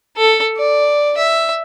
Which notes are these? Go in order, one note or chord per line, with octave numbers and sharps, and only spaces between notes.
A4
D5
E5